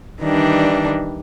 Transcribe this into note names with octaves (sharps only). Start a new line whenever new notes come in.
D#3 E3 G3 D4